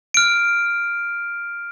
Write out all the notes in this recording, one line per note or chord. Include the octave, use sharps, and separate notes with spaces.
F6 D7